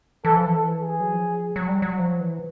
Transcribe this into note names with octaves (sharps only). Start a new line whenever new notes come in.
E3 A4
F3
E3
A4
G#4
F#3
F3
F#3
G3
F#3
F3
E3